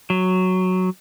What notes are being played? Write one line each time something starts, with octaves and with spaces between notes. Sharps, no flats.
F#3